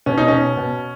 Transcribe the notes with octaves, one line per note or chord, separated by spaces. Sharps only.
B2 C#4
D#4
B2 C#4
B2